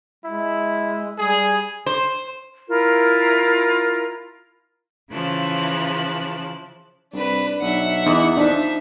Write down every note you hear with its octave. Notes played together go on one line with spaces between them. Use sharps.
G#3 E4
G3 G#4
C5
E4 F4 A#4
C#3 E3 F3 A5 F#6
C2 D4 B4
B1 E5 F#5
E2 E3 D#4
F3 D4 D#4 E5